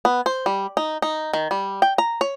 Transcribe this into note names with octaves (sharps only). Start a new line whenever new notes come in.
B3
C5
G3
D#4
D#4
D#3
G3
G5
A#5
C#5